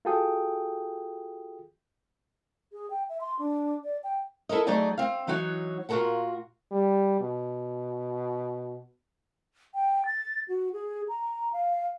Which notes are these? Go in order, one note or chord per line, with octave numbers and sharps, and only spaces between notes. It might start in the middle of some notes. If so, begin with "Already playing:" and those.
F4 F#4 G#4 A4 G5 D#6
G#4
G5
E5
C6
D4
D5
G5
E4 A4 A#4 D#5
F#3 A3 D#4 G#4 D5 D#5
C4 F5
E3 F#3 D#4 F#4 C#5
A#2 F4 F#4 A4 A#4 F#5
G3
B2
G5
A6
F#4
G#4
A#5
F5